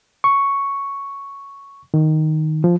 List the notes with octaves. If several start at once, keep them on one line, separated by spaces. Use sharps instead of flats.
C#6
D#3
F3